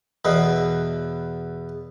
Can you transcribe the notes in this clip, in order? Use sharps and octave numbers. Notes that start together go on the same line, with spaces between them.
E2 B2 B3